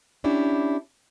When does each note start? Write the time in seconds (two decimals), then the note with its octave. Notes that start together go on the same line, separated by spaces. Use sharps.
0.24 C#4 D4 E4 G4